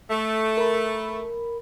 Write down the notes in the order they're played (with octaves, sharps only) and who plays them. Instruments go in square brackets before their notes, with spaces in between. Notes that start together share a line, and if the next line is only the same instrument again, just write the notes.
[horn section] A3
[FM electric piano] A#4 B5